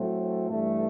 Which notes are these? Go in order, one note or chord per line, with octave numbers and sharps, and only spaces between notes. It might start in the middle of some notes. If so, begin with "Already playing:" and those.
Already playing: A2 F#3 A3 C4
G2 E3 A3